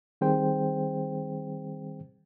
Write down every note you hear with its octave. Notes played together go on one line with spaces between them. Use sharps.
D#3 G3 C4 G#4 C5 G5